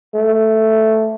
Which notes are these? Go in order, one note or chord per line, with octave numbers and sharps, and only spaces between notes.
A3